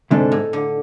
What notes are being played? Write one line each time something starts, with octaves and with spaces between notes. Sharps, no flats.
D2 G#2 C3 G#3 D4 A4
A2
D3